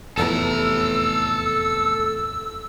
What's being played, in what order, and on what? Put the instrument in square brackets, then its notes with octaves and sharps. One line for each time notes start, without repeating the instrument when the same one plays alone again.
[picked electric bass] F1 E2 A2 [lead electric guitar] A4 A#5 [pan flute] E6